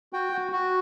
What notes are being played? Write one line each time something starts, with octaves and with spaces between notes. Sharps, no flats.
F#4 G5
F#4
F#4